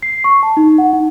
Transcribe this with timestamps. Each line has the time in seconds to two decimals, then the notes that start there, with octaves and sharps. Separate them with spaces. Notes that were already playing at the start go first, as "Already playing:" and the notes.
0.03 C7
0.24 C#6
0.43 A5
0.57 D#4
0.78 F#5
0.93 D#4